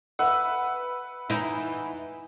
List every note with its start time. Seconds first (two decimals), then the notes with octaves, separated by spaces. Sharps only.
0.19 B4 E5 F#5
1.30 E3 D#4 E4